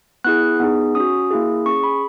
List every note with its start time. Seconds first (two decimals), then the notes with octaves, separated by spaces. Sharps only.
0.24 B3 E4 G#4 F#6
0.60 B3 D#4 G#4
0.95 C#4 F#4 D#6
1.31 A#3 E4 G#4
1.66 C#4 G#4 C#6
1.83 B5